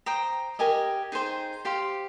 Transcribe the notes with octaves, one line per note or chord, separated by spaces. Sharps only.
C5 G5 A#5 D#6
G4 A#4 D#5 G#5
D#4 G#4 C5 G5
G4 C5 F5 C6